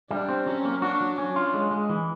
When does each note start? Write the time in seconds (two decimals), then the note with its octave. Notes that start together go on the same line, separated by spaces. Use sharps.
0.11 G3 D4
0.29 C4
0.46 F#3 C#4
0.65 A#3
0.82 D4 F#4
1.01 F#3
1.18 C#4 D4
1.36 F4
1.54 G#3
1.71 G#3
1.89 E3